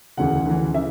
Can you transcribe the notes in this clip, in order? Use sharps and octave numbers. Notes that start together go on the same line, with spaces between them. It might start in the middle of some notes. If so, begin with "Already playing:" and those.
E1 D2 C#3 E3 F#5
D2 C#3 E3
C#3 E3 E5